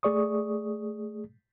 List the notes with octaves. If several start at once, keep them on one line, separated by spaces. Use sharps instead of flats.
A3 G#4 D5 C#6 D#6